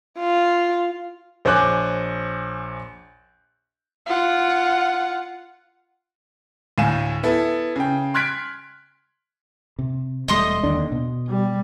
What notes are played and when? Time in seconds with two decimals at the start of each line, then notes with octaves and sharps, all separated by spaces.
0.19 F4
1.45 A#1 C5 C#5 G#5 D6 F#6
4.06 F4 F#5
6.78 D2 A2 F5 G#5 E7
7.23 B3 E4 A4
7.76 C#3 G5
8.14 C6 F6 F#6 G#6 B6 D7
9.79 C3
10.28 E1 G3 A3 D#5 C6 D#6
10.63 D#2 D3 D4
10.92 B2
11.29 G3